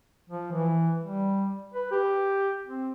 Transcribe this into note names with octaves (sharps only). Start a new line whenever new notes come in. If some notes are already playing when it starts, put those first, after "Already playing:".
F3
E3
G3
B4
G4
C4